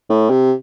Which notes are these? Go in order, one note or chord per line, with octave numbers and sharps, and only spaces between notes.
A2
C3